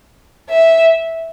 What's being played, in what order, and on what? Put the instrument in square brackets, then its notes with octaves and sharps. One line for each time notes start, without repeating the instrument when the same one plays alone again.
[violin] E5